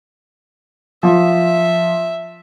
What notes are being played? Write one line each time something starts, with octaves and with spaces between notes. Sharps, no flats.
F3 E5